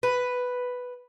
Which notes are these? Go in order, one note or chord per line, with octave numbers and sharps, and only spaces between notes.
B4